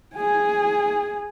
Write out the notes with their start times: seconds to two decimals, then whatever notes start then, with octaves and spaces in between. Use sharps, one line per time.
0.15 G#4 G#5